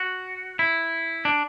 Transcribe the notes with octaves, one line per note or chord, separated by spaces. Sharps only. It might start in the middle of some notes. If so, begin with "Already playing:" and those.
Already playing: F#4
E4
D4